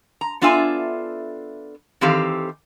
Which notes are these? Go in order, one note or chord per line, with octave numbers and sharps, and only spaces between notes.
A#5
B3 D4 F4 A4 E5 G#5
D#3 E3 C4 G4 A4 F5